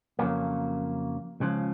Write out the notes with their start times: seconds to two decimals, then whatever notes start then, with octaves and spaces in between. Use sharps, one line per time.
0.19 F2 C#3 F#3 A#3
1.40 C#2 C#3 F3